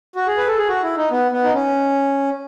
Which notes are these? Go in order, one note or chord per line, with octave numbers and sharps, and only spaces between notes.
F#4
G#4
B4
A4
G#4
F#4
E4
D#4
B3
B3
D#4
C#4